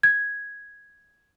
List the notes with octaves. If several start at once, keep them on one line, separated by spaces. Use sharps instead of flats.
G#6